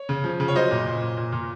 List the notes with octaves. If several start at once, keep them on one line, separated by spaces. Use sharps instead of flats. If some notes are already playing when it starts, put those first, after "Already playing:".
Already playing: C#5
C#3
F3
C#3
C#5
F#3 C5 D#5
A#2
A#2
A#2
A#2
A#2